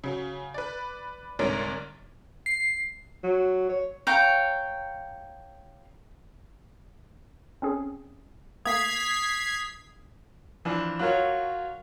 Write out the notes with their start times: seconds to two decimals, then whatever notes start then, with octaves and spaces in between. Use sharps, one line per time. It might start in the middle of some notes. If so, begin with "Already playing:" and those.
0.04 C#3 F#3
0.54 B4 D5
1.39 C2 G#2 D3 A#4 C#5 D5
2.46 C7
3.23 F#3
3.69 C#5
4.07 C#5 F5 G5 A#5
7.62 C4 C#4 G#4
8.65 A3 A#3 D#6 G#6 B6 C7
10.65 E3 F3 D4
10.99 F#3 F4 A#4 C#5